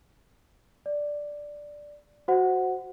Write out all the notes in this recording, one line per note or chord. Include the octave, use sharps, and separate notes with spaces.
D5
F#4 C5 F#5